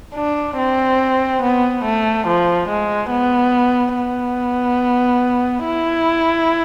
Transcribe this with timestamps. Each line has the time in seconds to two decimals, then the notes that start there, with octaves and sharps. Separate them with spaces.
0.15 D4
0.58 C4
1.43 B3
1.84 A3
2.27 F3
2.69 G#3
3.11 B3
3.96 B3
5.65 E4